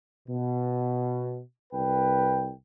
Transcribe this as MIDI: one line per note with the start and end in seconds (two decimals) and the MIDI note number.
0.29 1.41 47
1.73 2.52 36
1.73 2.52 71
1.73 2.52 79